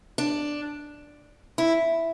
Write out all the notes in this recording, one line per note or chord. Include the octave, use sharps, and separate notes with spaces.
D4
E4